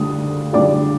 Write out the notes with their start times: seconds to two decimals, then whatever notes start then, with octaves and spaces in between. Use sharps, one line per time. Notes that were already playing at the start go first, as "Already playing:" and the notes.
Already playing: D3 G3 D4 F4 D#6
0.53 D3 G3 D4 F4 D5 D6